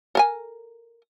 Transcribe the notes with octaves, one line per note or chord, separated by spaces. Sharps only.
A4 A#4 G#5